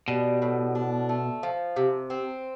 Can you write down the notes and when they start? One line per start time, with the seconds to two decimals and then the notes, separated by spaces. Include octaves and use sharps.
0.08 B2 G3
0.42 A2
0.75 D4
1.09 A3
1.43 F3
1.76 C3
2.10 C4